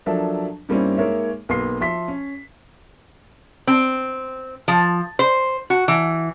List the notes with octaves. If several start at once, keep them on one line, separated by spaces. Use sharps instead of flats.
F3 F#3 D4 A4 A#4 E5
G2 G3 A#3 C4 C#4 E4
G#3 A#3 D#4 A#4 C#5 E5
B1 A#3 B3 C6 C7
F3 E5 C6 B6
C#4
C4
F3
C5
F#4
E3